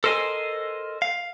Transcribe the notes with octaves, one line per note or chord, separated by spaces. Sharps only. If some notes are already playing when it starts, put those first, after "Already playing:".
A4 A#4 C5 D#5 G#5
F5